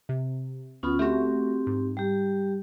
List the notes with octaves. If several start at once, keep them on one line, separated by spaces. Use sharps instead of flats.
C3
D2 B3 C#4 F4 B5
A3 C4 F#4 G4
G#2
G3 G4